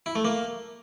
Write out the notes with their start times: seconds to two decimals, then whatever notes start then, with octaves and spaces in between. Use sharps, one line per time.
0.06 E4
0.15 A3
0.25 A#3